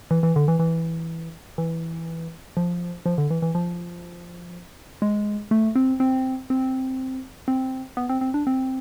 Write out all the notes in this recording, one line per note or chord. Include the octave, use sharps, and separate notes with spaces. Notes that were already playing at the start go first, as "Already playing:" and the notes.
E3
E3
D3
E3
E3
E3
F3
F3
D3
E3
E3
F3
G#3
A3
C4
C4
C4
C4
B3
C4
C4
D4
C4